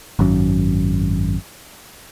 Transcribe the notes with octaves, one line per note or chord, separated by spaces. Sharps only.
G#1 F#2